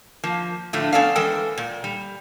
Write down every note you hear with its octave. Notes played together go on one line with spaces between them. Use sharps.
F3 A#3
A2 D3 F3 A3 F4
B3 C#4 A4 D5 F5
E3 G#3 A4 A#4 G5
A#2
G3